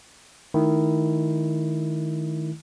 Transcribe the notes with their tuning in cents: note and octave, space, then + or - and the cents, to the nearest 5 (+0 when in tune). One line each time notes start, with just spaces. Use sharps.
D#3 +0 A3 -35 E4 +0